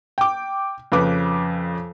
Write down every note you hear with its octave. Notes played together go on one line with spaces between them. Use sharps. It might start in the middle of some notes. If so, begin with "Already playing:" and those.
G5 D6
F2 C#3 B4 D6